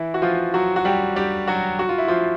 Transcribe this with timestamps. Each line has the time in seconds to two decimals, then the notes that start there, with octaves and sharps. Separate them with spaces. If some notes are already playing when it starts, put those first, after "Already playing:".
Already playing: E3 E4
0.14 F#4
0.22 F3 F4
0.54 F#3 F#4
0.76 F#4
0.85 G3 G4
1.16 G3 G4
1.47 F#3 F#4
1.79 F#4
1.89 F4
1.98 E4
2.08 F3 F4